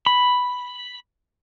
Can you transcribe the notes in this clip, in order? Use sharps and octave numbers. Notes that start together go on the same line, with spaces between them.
B5